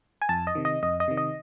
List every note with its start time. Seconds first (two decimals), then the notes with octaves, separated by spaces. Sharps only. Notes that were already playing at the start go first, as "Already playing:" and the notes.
0.22 G#5
0.29 F2 A5
0.47 D#5
0.55 C3 D#3
0.65 D#5
0.83 F2 D#5
1.00 D#5
1.08 C3 D#3
1.17 D#5